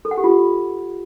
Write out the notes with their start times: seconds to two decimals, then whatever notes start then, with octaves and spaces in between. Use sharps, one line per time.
0.05 A4
0.11 F#5
0.17 G4
0.24 F4